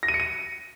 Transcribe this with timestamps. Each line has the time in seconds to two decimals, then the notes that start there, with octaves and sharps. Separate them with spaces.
0.03 A#6
0.08 D#7
0.14 C#7
0.20 D#7